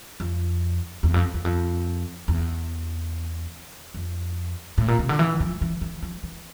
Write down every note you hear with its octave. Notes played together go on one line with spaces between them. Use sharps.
F2
E2
F2
E2
F2
E2
F2
A2
A#2
C3
D3
E3
F3
E3
E3
F3
E3